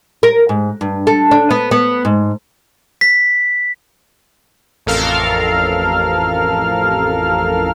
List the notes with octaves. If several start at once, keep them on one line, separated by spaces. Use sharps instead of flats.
A#4
G#2
G2
A4
D4
B3
B3
G#2
B6
A1 F2 A4 A#4 F5 F6